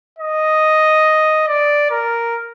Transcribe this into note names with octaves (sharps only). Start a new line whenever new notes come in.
D#5
D5
A#4